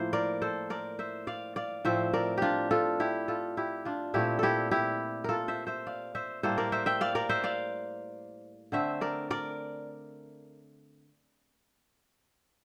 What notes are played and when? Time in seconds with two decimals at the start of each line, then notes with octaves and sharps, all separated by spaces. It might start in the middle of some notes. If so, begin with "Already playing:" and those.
Already playing: A2 F3 A#3 E4 C5
0.13 A#4 D5
0.42 A4 C5
0.70 A#4 D5
0.99 C5 E5
1.27 D5 F5
1.56 D5 F5
1.85 A2 F3 C4 C5 E5
2.13 A#4 D5
2.38 D4 F4 G4
2.71 F4 A4
3.00 E4 G4
3.28 F4 A4
3.57 E4 G4
3.85 D4 F4
4.14 A#2 A3 C4 E4 G4
4.39 E4 G4 A4
4.71 E4 G4
5.24 F4 A4 A#4
5.48 C5 E5
5.67 C5 E5
5.87 D5 F5
6.15 C5 E5
6.43 A2 G3 A#3 A4 C5
6.58 A#4 D5
6.72 C5 E5
6.86 E5 G5
7.01 D5 F5
7.15 A#4 D5
7.29 C5 E5
7.44 D5 F5
8.72 D3 A3 C4 C5 E5
9.01 A#4 D5
9.31 A#4 D5